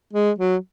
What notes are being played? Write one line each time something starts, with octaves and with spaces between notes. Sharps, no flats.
G#3
F#3